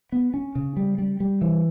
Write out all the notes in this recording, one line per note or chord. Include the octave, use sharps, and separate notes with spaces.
B3
C#4
C#3
G3
G3
G3
E3